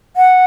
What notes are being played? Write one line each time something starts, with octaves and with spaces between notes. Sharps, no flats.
F#5